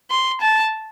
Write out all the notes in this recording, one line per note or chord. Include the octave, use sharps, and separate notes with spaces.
C6
A5